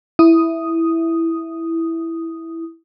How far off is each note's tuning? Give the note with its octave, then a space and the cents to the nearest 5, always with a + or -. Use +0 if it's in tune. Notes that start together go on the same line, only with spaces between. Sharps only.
E4 +0 D#6 +0